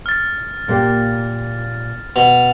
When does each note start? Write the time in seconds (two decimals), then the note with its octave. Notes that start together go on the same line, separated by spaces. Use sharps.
0.06 F6 A6
0.68 A#2 A#3 G4
2.16 B2 F7